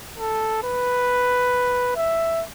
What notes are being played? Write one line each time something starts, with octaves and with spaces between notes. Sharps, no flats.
A4
B4
E5